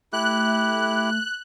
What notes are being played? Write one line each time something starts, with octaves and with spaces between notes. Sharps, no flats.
A3 E4 G4 F#6